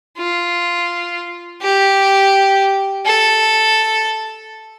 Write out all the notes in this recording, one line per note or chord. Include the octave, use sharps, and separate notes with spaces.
F4
G4
A4